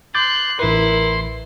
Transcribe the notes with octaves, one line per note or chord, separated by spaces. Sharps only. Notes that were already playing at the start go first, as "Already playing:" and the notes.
C6 D6 F#6 G6 A6
A1 E4 A#4 B4 C6